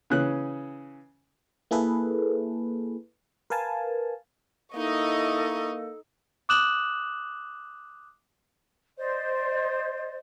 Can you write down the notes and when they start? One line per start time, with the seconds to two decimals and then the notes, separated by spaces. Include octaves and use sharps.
0.10 C#3 E3 C#4 F#6
1.71 A#3 E4 G#4 A4 B4
3.50 A#4 B4 F5 G#5 A5
4.75 A#3 D#4 E4 A4 D#5 C#6
6.49 D6 D#6 F#6 E7 F#7
8.97 C5 D5 D#5